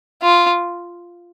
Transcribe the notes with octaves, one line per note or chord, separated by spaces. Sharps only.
F4